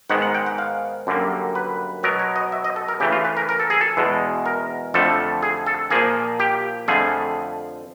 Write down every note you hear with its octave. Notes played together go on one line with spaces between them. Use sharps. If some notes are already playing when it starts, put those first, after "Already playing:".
G#2 D#3 G#3 B3 F#5
F#5
G5
F#5
F5
F#2 D3 G3 A#3
B4
B2 F#3 B3 A#4
C#5
D#5
E5
D#5
A4
A#4
C#3 E3 A3 G4
F4
B4
A#4
A#4
A4
G#4
A4
E2 B2 G#3
A#4
F2 D3 F3 A3 A4
G#4
A4
A#2 F3 A#3 G#4
G4
F2 D3 F3 A3 G#4